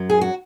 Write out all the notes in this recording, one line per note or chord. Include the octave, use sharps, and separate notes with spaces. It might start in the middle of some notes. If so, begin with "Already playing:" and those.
Already playing: F#2 F#3
G#4
F#4